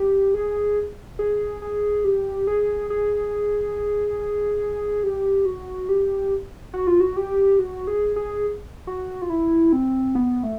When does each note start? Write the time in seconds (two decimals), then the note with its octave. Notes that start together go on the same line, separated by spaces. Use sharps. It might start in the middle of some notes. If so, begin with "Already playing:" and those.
Already playing: G4
0.34 G#4
1.19 G#4
1.62 G#4
2.04 G4
2.47 G#4
2.90 G#4
5.03 G4
5.46 F#4
5.89 G4
6.74 F#4
6.87 F4
7.00 F#4
7.17 G4
7.59 F#4
7.87 G#4
8.16 G#4
8.87 F#4
9.22 F4
9.30 E4
9.73 C4
10.15 B3
10.43 A3